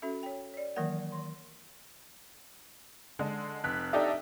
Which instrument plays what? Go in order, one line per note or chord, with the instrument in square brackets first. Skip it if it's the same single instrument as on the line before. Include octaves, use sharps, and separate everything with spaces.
[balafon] C#4 F#4 A4 E5
C#5 G5
C#5 D5
D#3 E3 F#3 A#3 A#4 F#5
D#3 C6
[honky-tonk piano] D3 G#3
F1 F#6 B6
D4 D#4 G4 A4 D5 E5